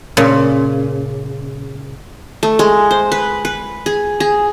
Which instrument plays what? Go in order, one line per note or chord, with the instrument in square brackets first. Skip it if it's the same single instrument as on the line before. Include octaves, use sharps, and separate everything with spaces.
[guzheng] A#2 C#3
[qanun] A3
G#3
C5
B4
B4
G#4
G#4